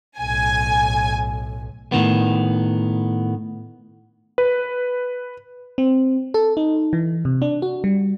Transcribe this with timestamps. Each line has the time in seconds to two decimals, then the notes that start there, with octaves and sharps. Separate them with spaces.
0.19 B1 A2 G#5
1.92 A2 D#3 B3
4.38 B4
5.78 C4
6.34 A4
6.57 D#4
6.93 E3
7.25 C3
7.42 D4
7.62 F#4
7.84 G3